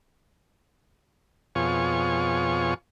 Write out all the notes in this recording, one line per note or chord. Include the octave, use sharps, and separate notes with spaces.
F2 B2 F4 G#4 C#5 C#6